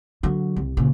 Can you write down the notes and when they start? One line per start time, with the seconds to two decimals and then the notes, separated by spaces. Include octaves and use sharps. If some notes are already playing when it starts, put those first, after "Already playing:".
0.23 D3 F#3
0.56 C2
0.77 A#2 C#3